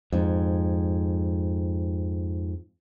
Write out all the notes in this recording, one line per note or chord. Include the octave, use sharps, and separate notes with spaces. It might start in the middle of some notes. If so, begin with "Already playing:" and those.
F2 G#2